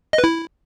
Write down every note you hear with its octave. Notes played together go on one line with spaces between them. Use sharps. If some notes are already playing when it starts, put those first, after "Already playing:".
D#5
B4
E4